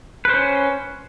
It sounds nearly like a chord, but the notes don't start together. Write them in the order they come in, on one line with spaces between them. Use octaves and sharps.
B4 C5 C#4